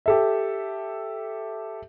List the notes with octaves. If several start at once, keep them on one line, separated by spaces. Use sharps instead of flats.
G4 A4 E5